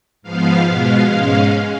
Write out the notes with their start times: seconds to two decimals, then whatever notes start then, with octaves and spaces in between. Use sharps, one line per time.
0.22 G#2 F3 B3 F5
0.66 B2 G#3 B3 F5
1.09 G#2 G#3 C#4